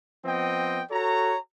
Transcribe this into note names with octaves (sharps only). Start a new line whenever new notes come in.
F3 B3 C4 D#5 G5
F#4 A4 C#5 A#5